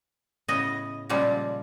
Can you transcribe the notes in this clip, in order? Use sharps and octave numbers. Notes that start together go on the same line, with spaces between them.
A2 C#3 B3 D#5
A#2 C#3 F3 G3 G#3